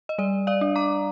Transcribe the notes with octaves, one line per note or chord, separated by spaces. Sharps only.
D#5
G3 D5
D5 F5
D4
A#5 D6